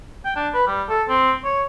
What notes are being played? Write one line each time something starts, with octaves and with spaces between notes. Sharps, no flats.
G5
D4
B4
G3
A4
C4
C#5